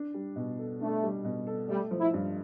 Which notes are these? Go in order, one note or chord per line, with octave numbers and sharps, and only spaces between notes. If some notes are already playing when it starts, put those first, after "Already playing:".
Already playing: D4
G3
B2
A4
A3 D4
G3
B2
A4
G3 A3
F3
E4
G2